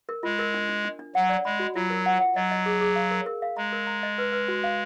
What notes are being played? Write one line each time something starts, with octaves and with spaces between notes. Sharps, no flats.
A#4
G#3 F4
A#4
D4
D4
D4
D4
F#3 F#5
D5
G#3 B5
F#4
F#3 F4
A#4
F#5
F#5
F#3 D#5
D#5
G#4
G#4
F5
A#4
A#4
F5
G#3 A#5
A#4
A#5
D#5
B4
B4
F#4
F5